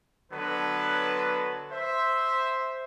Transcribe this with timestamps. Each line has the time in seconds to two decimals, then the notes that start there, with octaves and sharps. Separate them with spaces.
0.32 D3 F#3 B3 B4 A5
1.72 C5 E5